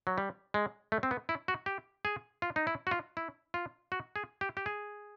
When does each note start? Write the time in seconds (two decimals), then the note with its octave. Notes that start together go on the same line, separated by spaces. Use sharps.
0.07 F#3
0.18 G3
0.54 G#3
0.92 A3
1.03 C4
1.11 B3
1.29 E4
1.48 F#4
1.66 G4
2.05 G#4
2.42 F4
2.56 D#4
2.67 E4
2.87 F#4
2.91 F4
3.17 E4
3.54 F4
3.92 F#4
4.16 G#4
4.41 G4
4.57 G4
4.66 G#4